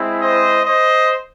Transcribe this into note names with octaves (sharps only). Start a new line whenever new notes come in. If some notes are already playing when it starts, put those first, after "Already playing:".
Already playing: G#3 C4 E4
C5 D#5
C5 D#5